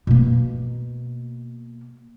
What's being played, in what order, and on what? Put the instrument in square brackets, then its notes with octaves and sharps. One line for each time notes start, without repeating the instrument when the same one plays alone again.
[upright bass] B2 A#3